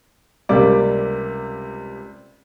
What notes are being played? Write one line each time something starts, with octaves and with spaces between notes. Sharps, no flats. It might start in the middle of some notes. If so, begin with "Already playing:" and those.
C#2 C3 G3 A#3 D5 D6